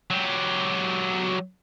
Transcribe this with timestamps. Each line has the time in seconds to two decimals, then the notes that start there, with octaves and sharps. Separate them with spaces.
0.10 F#3 G4